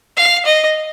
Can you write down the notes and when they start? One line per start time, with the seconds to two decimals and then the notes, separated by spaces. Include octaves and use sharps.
0.17 F5
0.45 D#5